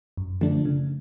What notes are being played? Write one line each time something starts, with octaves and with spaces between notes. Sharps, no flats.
F#2
D3 F3 A3 D4
C#3